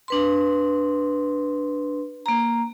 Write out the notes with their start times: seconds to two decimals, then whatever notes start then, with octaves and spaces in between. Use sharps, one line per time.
0.08 D4 B4 C6
2.26 A#3 A#5